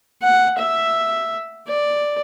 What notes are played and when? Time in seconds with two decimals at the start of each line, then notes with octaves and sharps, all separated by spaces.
0.22 F#5
0.58 E5
1.68 D5